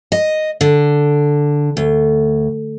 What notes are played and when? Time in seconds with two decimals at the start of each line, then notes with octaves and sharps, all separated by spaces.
0.12 D#5
0.61 D3
1.77 D2